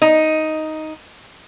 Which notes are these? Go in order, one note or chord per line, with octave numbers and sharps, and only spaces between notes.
D#4